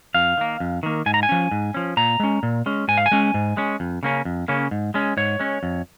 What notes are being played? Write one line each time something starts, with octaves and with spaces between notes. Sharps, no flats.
F2 F5
D#3 A#3
F2
D#3 A#3
G#2 G#5
A#5
G#5
F3 C#4
G#2
F3 C#4
A#2 A#5
G#3 C#4
A#2
G#3 C#4
G#2 G#5
F5
G#5
G#3 C#4
G#2
G#3 C#4
F2
C#3 A#3 C#4
F2
C#3 A#3 C#4
G#2
G#3 C#4
G#2 C#5
G#3 C#4
F2